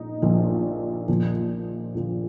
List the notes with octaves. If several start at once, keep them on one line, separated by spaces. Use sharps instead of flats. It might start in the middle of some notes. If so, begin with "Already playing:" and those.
Already playing: A#1 A#2 D#4
A#1 A#2 F3
A#1 A#2 F3
A#1 A#2 F3